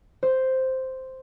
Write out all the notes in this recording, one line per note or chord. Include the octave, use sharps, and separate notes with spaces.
C5